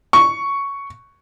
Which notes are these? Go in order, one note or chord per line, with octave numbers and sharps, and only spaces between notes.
C#6